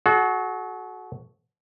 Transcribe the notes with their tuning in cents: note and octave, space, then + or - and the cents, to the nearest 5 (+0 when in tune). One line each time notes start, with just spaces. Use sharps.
F#4 +0 A4 -45